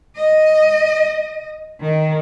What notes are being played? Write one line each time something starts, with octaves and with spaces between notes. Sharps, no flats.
D#5
D#3